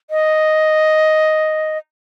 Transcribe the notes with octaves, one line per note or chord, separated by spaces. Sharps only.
D#5